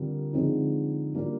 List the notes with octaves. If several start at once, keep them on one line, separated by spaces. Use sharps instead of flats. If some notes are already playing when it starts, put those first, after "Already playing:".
Already playing: D3 G3 C4 F4 A#4
D3 F3 G#3 C4 D#4
G3 A#3 D4 F4